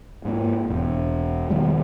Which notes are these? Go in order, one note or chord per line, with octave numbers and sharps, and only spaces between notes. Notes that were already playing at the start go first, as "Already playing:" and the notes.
G#2 A#3
E1 E2
B2 D#3 G3 G#3